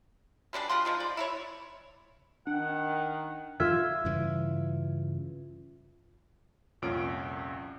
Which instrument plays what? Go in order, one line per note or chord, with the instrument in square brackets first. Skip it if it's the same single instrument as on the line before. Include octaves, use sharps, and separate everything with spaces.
[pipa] B2 G3 D4 G#4
F4 G4 F#5 C6
F3 G#3 D#4
D5
E4 A4 C#5
[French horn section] D#3 [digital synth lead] D4 [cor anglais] F#5
[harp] F4 E5 G#6
[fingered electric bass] G2 C#3 E3
[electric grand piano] C2 F2 A#2 C#4 D7